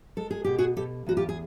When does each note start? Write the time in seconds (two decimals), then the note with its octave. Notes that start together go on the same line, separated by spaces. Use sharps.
0.17 G#3 A4
0.31 G#4
0.44 B2 G4
0.58 F#4 G#4
0.77 B2 G4 A4
1.06 E2 F#4
1.17 F4 G4
1.29 G#4